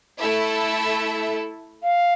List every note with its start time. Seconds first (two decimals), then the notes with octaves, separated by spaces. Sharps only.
0.20 A3 E4 A4 E5
1.83 F5